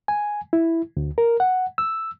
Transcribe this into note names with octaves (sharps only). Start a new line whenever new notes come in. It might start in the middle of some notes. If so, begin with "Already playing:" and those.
G#5
E4
D2
A#4
F#5
E6